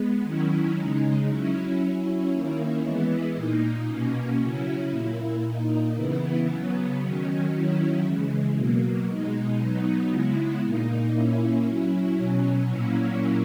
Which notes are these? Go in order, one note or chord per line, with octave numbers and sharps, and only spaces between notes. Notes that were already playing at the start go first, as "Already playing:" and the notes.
Already playing: G#3 B3
D#3 F#3 C#4 E4
C#3 G#3 D#4
F#3 C#4 E4
F#3 C#4 E4
D#3 A#3 C#4 E4
E3 G#3 B3 E4
A#2 A#3 D#4
B2 A#3 C#4
C#3 F#3 C#4 E4
A#2 A#3 E4
A#2 A#3 D#4
C#3 E3 B3 E4
C#3 F#3 B3
D#3 F#3 C#4
D#3 F#3 C#4 E4
C#3 E3 G#3
B2 F#3 A#3
B2 G#3 D#4
F#3 B3 D#4
C#3 G#3 B3 E4
A#2 A#3 D#4
A#2 A#3 C#4 E4
F#3 C#4 E4
B2 F#3 C#4
A#2 F#3 A#3 C#4 E4